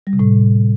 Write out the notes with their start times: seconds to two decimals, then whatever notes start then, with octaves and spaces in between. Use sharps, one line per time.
0.07 G3
0.13 C3
0.19 A2